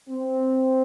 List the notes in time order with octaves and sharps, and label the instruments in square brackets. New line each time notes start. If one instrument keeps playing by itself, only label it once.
[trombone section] C4